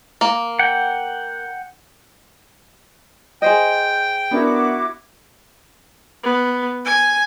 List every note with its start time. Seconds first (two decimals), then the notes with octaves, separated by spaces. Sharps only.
0.21 A#3
0.59 F#5 G5
3.42 G#4 C5 D#5 G5
4.31 B3 D4 E4 F#4 A#4 D6
6.24 B3
6.85 G#5